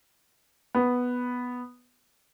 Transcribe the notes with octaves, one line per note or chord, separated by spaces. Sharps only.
B3